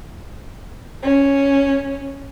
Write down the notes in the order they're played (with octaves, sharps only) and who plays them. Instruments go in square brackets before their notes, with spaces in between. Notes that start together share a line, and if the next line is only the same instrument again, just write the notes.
[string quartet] C#4